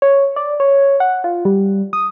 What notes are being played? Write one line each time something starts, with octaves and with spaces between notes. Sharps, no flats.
C#5
D5
C#5
F#5
F4
G3
D#6